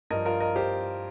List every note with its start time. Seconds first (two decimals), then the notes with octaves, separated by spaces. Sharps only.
0.10 G2 F3 A#4 D#5
0.26 F4 A#4
0.40 A#4 D#5
0.56 G4 C5